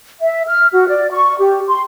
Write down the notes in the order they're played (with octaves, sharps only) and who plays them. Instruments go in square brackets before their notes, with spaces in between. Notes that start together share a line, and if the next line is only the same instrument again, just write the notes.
[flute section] E5
F6
F#4
D5
C#6
G4
C6